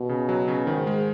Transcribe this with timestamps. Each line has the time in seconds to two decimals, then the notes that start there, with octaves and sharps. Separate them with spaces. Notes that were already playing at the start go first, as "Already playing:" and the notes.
Already playing: B2
0.09 C#3
0.29 F#3
0.48 C#3
0.67 G#2 D#3
0.87 G#3